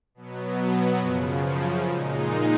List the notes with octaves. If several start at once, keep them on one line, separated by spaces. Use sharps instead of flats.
B2 F#3 B3
F#2 C#3 F3
A#2 G#3 D#4